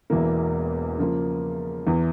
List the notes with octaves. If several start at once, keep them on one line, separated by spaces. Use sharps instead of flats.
E1 E2 E3 A#3
C#3 F3 A#3
E2 E3